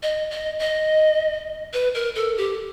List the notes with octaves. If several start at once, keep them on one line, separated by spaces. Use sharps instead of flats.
D#5
D#5
D#5
B4
A#4
A4
G4